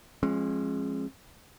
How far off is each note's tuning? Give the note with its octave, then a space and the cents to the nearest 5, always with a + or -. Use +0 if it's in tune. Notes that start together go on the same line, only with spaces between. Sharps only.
F3 +0 G#3 +0 C#4 -45